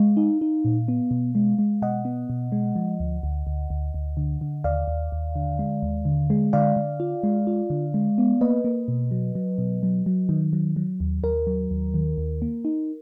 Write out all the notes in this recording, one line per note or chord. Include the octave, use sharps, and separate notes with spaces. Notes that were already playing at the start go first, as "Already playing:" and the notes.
Already playing: G#3 F5
D#4
D#4
A#2
B3
B2
G#3
G#3
B2 D#5 F#5
B3
B2
G#3
F3
D2
D2
D2
D2
D2
D3
D3
D#2 D5 F5
D#2
D#2
D3
G#3
D#2
D3
G#3
D3 D5 F5
D3
F4
G#3
F4
D3
G#3
B3
A#3 B4 D#5
A#3
B2
F#3
F#3
B2
F#3
F#3
D#3
F#3
F#3
D#2
D#2 A#4
F#3
D#2
D#3
D#2
A#3
D#4